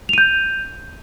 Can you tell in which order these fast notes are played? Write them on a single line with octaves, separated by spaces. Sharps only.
F7 D#7 G6